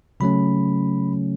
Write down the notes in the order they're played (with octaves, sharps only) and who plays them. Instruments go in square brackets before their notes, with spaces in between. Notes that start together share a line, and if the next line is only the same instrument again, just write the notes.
[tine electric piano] C#3 F#3 A3 C#4 B5